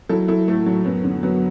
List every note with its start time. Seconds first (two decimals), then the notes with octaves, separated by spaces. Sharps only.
0.09 F#3 E4 A4
0.28 F#3 E4 A4
0.48 A2 A3
0.66 F#3
0.85 F#2 B3
1.04 D3
1.23 F#3 B3